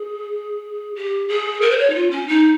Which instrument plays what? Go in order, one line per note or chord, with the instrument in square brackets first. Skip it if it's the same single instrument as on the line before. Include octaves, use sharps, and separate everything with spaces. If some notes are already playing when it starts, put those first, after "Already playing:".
Already playing: [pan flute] G#4
G4
G#4
A#4
C5
C#5
D#4
F4
C#4
D#4